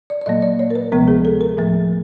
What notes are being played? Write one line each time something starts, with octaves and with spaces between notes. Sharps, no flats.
D5
D5
A#2 F#3 A#3 D#5
D5
C#5
A#4
B4
D2 C3 F3 G#3 B3 A#4
G#4
A4
A#4
A2 F3 A3